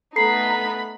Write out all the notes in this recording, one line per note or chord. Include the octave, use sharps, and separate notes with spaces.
A3 B3 D#4 A4 A#5 B5 C7